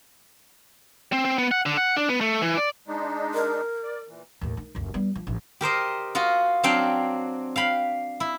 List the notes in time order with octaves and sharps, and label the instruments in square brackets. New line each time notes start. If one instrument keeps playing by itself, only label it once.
[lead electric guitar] C4
C4
B3
F#5
D3
F#5
D4
B3
A3
E3
D5
[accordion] G#3 D4 D#4
[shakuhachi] A#4
[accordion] D5
A#2 E3
[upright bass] D#2 A2
D#3
F#1 D2
G3 B3
F3
A1
[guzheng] G4 A#4 C5 D#5
F4 F#4 D#5
F#3 C4 D4 F5 G5
F5 G5 B5
E4